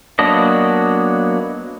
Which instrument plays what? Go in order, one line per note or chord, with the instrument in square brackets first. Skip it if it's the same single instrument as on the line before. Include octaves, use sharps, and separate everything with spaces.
[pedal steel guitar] F#3 A#3 B3 D4 D#5